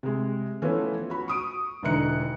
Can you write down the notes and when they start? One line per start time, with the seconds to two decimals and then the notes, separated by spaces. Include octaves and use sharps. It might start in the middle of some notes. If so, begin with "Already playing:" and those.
0.03 C3 G#3
0.62 E3 F3 A3 B3 C#4
1.10 F#4 B5
1.28 C#6 D#6 D7
1.83 E1 D3 E3 D#4 F#6 C#7